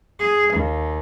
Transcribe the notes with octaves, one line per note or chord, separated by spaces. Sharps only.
G#4
D#2